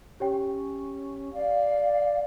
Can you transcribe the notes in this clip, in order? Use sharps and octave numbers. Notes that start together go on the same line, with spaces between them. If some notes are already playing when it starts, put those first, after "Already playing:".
C#4 G4 C#5 G5
D5 F5